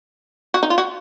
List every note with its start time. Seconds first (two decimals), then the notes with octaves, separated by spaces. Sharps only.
0.54 F#4
0.63 D#4
0.70 F4
0.78 F#4